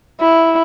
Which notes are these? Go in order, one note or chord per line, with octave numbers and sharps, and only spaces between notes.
E4